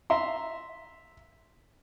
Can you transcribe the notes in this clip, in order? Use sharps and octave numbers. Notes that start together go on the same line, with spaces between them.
E5 A#5 C6